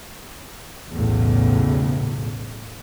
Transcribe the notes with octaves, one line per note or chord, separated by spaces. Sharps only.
B1 E2 A2 C#3